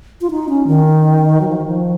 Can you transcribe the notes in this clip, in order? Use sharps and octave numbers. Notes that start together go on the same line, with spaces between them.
F4
D#4
C#4
D#3
F#3
F3
D#3
F3